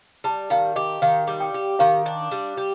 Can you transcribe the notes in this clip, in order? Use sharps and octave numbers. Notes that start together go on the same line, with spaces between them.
G3 A5
D#3 F5
G4 D#5
D#3 F5
G3
G5
G4
D#3 F5
D4
G3
G4